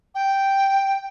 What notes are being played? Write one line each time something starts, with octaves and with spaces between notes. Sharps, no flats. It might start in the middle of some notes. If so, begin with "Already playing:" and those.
G5